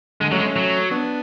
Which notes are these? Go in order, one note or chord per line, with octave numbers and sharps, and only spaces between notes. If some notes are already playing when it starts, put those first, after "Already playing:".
D3 G#3
F#3 A3 C#4
G#3
A3 C#4
F#3
B3 D4